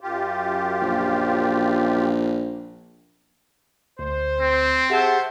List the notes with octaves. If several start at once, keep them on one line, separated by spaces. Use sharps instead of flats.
F#2 F4 G4
A#1
D2 C5
C4
G4 G#4 C5 E5 F#5 A5